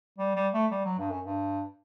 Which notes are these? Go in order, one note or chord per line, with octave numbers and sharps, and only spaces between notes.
G3
G3
A3
G3
F#3
G2
F#2
G2